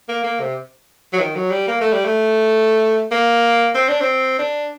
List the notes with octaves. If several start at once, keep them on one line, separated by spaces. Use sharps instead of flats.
A#3
A#3
C3
F#3
D#3
F#3
G3
A#3
A3
G3
A3
A#3
C4
D4
C4
D4